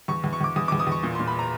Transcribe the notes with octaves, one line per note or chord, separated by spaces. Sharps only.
E2 C#6
E2
C#6
E2 D6
E2 D#6
D6
E2
D#6
E2 C#6
A#2
C6
A#2
B5
A#5